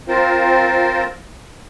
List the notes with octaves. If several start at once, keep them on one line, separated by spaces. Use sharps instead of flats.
C4 F4 A#4 C5